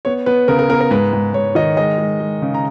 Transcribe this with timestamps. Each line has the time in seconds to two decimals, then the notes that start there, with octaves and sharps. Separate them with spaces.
0.05 B3 C#5
0.26 B3 B4
0.48 C#3 A#4
0.59 A#4
0.69 B3 A#4
0.81 A#4
0.91 G#2 B4
1.13 G#2
1.34 G#2 C#5
1.55 D#3 D#5
1.77 G#3 D#5
1.98 G#3
2.20 G#3
2.42 C#3
2.54 A#5